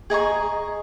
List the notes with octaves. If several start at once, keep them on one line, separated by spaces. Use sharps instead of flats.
G#4 D#5 A#5 C#6